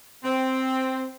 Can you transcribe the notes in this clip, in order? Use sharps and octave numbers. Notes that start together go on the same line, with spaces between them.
C4